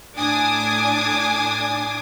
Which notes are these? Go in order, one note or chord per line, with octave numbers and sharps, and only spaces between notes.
A2 D4 G#5 D6 D#6